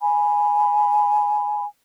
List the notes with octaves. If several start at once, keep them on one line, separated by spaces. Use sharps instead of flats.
G#5 B5